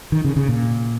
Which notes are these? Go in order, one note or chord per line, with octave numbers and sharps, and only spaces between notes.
D#3
C#3
C#3
A#2